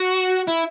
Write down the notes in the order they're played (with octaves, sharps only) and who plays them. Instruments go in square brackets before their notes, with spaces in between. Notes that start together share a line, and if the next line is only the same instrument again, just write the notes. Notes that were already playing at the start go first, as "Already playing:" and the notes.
Already playing: [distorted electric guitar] F#4
E4